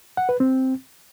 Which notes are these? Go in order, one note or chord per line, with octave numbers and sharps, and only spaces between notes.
F#5
B4
C4